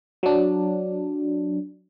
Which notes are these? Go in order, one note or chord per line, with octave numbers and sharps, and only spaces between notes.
F#3 D4